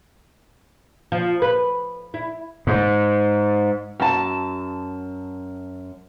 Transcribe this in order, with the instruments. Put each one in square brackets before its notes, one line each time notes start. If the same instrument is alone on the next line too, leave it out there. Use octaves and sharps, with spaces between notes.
[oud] F3
B4
E4
[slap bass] G#2
[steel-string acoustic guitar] F#2 A5